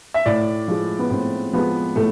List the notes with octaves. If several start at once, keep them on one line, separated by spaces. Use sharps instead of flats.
E5
A2 D5
F3 G#3
B3
A2 C4
F3 G#3 B3
A2 A3